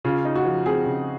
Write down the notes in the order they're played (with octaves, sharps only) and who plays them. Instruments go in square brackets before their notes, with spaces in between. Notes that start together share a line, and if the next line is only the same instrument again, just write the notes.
[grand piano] C#3 [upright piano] F4
[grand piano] D#4
[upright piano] F#4
[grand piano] F3
[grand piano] C4 [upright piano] G#4
[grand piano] C#3